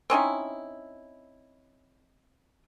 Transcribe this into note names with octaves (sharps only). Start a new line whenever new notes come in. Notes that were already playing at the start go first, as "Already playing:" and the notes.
C4 C#4 D#4 E4